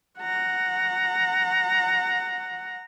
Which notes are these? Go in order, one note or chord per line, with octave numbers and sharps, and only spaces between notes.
F#5 A#5